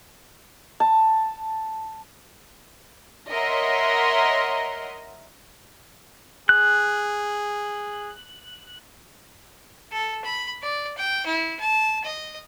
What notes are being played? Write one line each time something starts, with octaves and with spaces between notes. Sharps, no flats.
A5
A#4 C#5 D#5 E5 F#5 C6
G#4 F#6
A4
B5
D5
G5
E4
A5
D#5